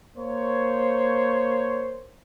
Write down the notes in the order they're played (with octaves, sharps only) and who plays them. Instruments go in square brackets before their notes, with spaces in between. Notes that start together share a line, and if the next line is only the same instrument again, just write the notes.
[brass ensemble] A#3 C5 C#5